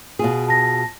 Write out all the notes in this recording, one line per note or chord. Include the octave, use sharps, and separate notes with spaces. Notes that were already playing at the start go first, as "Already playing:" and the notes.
B2 F4 G#4
A5 A#6